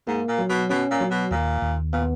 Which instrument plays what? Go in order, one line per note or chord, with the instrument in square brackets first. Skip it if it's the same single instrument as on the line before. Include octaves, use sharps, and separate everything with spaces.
[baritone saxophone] G#2 [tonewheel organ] A#3
[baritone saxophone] A#2
[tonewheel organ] F#3
[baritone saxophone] B2
[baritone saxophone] B2 [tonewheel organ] C#4
[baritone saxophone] A#2
[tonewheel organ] F#3
[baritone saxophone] B2
[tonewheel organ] D#2 [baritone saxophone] A#2
[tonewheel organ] D#2
[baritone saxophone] A#2 [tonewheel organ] B3